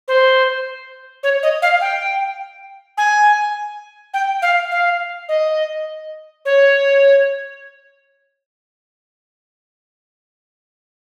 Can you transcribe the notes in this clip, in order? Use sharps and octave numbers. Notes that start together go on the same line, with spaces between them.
C5
C#5
D#5
F5
G5
G#5
G5
F5
F5
D#5
C#5